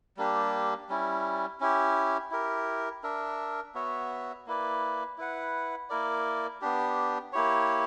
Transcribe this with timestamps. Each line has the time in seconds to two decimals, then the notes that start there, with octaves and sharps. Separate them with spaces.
0.17 G3 A#3 D4 G4
0.89 G3 C#4 E4
1.60 C#4 E4 G4
2.31 E4 G4 A#4
3.03 D4 A#4 E5
3.75 B3 F#4 C#5 E5
4.47 A#3 E4 B4 D5
5.18 E4 B4 F#5
5.90 A#3 E4 A#4 D5
6.61 B3 D4 G4
7.33 A#3 E4 G4 C#5